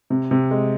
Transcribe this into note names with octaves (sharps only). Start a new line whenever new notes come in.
C3
C3
G#3